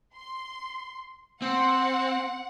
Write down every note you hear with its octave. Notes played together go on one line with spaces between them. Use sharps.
C6
C4 F#5